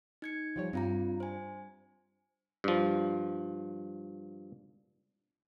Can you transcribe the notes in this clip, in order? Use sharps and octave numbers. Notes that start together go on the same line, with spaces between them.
D#4 G#6 C#7
F3 G3 C#5
G2 C4 F4 A#5
C5 G#5
G2 F3